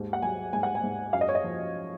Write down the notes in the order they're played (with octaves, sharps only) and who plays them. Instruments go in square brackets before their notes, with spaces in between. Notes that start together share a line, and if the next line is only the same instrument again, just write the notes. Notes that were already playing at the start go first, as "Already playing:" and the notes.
Already playing: [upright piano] D#2 G#2
F#5
F#3 G#5
G#2 G#5
F#5
G#5
G#2
F#2 F5
D#5
C#5
D#5
F3